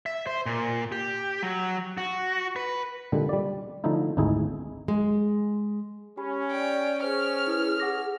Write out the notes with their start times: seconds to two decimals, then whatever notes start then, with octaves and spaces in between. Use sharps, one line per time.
0.06 E5
0.27 C5
0.46 A#2
0.92 G4
1.43 F#3
1.98 F#4
2.56 B4
3.12 A#2 D3 G3 G#3
3.29 G3 D5
3.84 D3 F3 A3 D#4 E4
4.17 G#1 D2 D#4 E4 G#4 G#5
4.88 G#3
6.17 C#4 G4 G#5 B5
6.51 D5 G5
7.03 G#4 C5 F6
7.47 E4 B4
7.80 F#5 D6 A#6